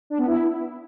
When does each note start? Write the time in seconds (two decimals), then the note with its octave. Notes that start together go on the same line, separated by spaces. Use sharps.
0.10 D4
0.18 B3
0.27 E4